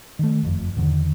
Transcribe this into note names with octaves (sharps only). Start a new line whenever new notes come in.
D#3 A3
F#1 F2
E2 G#2 D3 D#3